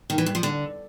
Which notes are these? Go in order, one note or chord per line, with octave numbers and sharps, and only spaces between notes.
D#3
E3
G2
F3
D3